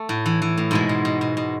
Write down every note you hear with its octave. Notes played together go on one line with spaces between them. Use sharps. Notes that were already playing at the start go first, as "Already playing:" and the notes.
Already playing: A3
A2
E3
E3
A2
G#2 B2 G#3
B2
B2
B2
B2